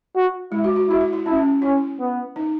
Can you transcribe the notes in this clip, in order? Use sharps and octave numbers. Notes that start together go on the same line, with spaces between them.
F#4
G#3 E4
F#4
F#4
E4 F#4
E4
E4
C#4 E4
C#4
C#4 E4
B3
D#4